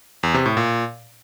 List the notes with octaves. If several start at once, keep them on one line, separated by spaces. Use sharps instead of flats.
E2
C3
A2
A#2